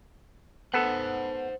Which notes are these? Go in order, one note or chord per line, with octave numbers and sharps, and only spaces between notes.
B3 A4 C5 F#5